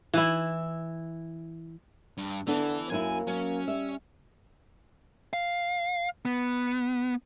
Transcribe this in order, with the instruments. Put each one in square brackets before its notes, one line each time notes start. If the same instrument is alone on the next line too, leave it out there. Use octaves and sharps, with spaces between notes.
[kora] E3 E4
[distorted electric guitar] G2
[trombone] D3 [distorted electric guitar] E3 [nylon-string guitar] B3 D4 A4
[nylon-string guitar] F#2 F#3 E4 [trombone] A#3 [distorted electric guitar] G#5
[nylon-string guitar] F#3 [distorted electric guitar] C#4
[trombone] G3 [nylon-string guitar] E5
[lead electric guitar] F5
B3